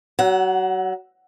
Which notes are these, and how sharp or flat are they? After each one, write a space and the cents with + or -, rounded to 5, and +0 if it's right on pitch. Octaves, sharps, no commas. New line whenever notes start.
F#3 +30 F#5 +0